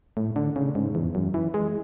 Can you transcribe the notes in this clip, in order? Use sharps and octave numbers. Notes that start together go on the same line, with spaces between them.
A2
D3
C#3
G#2
E2
F#2
E3
G#3